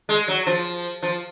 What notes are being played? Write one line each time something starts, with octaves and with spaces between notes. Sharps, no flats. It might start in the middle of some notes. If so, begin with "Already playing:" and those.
G#3
F#3
F3
F3